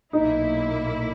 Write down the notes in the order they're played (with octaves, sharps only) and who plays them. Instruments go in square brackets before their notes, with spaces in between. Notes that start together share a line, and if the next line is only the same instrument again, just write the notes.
[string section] B1 A#2 A#3 E4 [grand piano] D#4